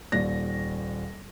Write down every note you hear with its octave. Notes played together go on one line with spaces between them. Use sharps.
D#1 D#2 D5 A#6